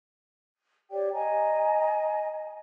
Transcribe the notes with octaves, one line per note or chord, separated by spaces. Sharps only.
G4 C#5 D5 G5
D#5 G#5 A#5